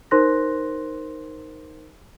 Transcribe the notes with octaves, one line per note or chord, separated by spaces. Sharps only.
D#4 A#4 C5 C6 F#6 A#6